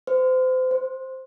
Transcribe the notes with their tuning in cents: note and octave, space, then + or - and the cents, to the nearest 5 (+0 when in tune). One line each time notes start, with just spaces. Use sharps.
C5 -30
C5 +5